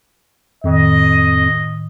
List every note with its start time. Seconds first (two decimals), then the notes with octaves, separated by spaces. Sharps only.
0.64 F2 A2 D#3 D#5